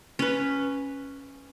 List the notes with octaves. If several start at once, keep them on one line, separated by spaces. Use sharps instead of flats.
C#4 B4